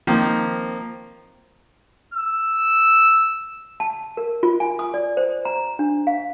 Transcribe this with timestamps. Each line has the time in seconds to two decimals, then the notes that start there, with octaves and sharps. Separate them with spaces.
0.07 D#3 F3 A#3 C4
2.14 E6
3.80 A5
4.17 A#4
4.43 F4
4.60 G#5
4.79 D#6
4.94 D5
5.17 C5
5.45 A#5
5.79 D4
6.07 F5